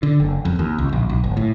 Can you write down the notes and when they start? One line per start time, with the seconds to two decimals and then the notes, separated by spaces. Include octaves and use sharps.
0.03 D3
0.20 F#1
0.45 F2
0.59 D#2
0.78 C#2
0.93 A#1
1.09 B1
1.24 G1
1.37 A2